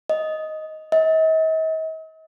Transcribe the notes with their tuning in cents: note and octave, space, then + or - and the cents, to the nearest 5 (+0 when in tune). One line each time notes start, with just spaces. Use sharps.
D#5 +5
D#5 +45